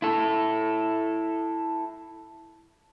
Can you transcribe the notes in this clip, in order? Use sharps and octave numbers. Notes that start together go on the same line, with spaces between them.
E4 A4